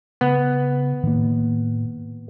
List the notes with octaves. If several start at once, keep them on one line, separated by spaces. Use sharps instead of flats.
C#3 B3
A2 D#3 A#3